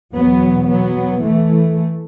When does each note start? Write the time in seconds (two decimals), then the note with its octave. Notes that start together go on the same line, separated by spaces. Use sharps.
0.15 E2 B2 F#3 B3
0.69 F#3 B3
1.23 E3 A3